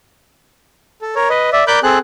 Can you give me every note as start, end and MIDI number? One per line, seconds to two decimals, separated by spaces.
1.02 1.15 69
1.15 1.29 70
1.15 1.29 73
1.30 1.50 71
1.30 1.50 75
1.53 1.64 74
1.53 1.64 76
1.67 1.79 70
1.67 1.79 74
1.67 1.79 83
1.67 1.79 86
1.67 1.79 90
1.67 1.79 91
1.83 1.99 60
1.83 1.99 68
1.83 1.99 69
1.83 1.99 90